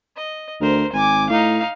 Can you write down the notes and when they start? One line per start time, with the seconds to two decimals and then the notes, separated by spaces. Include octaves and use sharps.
0.16 D#5
0.61 D2 A#4 C5
0.93 G#1 G#5 D6
1.30 A2 D#4 F5